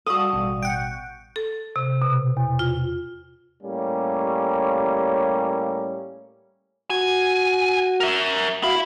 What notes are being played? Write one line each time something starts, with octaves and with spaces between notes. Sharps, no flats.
G3 F#4 A4 D5 F5 D#6 D#7
A1 B2 C#6
F#5 G5
A4
C3
B2
E2
F4
A2 G3 A#3 C#4
F#4 G#5
A#4 E5
E4 F#4 E5 F5